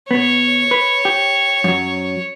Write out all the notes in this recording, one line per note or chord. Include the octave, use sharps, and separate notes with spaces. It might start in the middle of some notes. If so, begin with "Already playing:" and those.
B2 B3 C#5
B4
G4
F#2 F#3